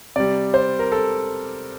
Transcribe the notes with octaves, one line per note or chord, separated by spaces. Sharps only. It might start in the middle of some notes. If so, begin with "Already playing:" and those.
C3 G3 D5
C5
A#4
A4